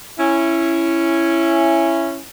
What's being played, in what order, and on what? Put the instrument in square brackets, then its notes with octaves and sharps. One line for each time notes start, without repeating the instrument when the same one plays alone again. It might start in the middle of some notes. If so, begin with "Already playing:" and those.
[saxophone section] C#4 E4